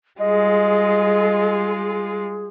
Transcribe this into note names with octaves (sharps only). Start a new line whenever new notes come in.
G3 G#3 F4 G#4 D#5